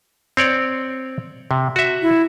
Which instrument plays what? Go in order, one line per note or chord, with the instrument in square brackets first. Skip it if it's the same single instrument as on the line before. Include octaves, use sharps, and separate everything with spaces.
[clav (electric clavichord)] C4 C#5 D5
C3
F#4 E5
[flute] E4